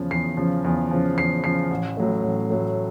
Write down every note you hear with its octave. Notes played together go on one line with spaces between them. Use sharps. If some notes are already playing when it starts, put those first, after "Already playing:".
Already playing: E2 C#3 F3
E2 C7
C#3 F3
E2
C#3 F3
E2 C7
C#3 F3 C7
A1
A2 F#3 A3
A1
A2 F#3 A3